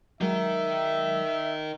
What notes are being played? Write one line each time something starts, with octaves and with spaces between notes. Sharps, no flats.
F#3 G#3 D#4 A#4 E5